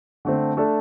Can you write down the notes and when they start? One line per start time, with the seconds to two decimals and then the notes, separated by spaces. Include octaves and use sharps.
0.25 D3 A3 C4
0.57 A3 D4 A4